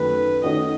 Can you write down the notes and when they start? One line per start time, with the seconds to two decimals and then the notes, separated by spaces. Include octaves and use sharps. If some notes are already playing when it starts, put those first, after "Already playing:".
Already playing: F#2 D#3 A3 B4
0.43 D#3 A3 C#4 F#4 C#5 D#5